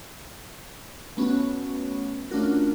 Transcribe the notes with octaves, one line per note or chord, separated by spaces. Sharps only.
A3 B3 C#4 F#4
A3 C#4 D4 F4 F#4 A#4